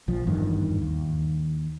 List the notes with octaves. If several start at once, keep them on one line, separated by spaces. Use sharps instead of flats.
A#1 F3
G#1 E2 G2 D#3
D#2